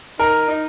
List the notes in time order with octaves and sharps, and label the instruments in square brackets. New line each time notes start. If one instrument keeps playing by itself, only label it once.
[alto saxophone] D#4 [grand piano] A#4
[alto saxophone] D#4